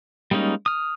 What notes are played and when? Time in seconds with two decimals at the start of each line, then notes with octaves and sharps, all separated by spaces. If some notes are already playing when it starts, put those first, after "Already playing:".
0.31 G3 G#3 A#3 C#4 D#4
0.66 D#6 F6